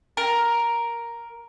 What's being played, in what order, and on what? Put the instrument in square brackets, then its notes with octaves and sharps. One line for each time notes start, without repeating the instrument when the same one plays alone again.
[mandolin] A#4